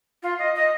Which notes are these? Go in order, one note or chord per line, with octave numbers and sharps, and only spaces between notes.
F4
D#5
D#5